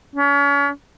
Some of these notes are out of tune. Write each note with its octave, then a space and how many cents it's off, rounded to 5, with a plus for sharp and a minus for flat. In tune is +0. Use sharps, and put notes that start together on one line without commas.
C#4 +35